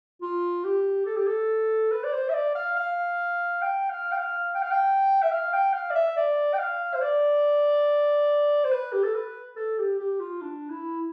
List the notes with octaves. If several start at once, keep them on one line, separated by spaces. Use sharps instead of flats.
F4
G4
A4
G4
A4
B4
D5
C5
E5
D5
F5
F5
G5
F5
G5
F5
G5
F5
G5
E5
F5
G5
F5
D5
E5
D5
G5
F5
C5
D5
C5
B4
G4
A4
B4
A4
G4
G4
F4
D4
E4